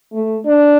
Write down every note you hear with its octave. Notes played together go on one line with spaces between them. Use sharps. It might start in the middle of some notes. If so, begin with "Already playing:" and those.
A3
D4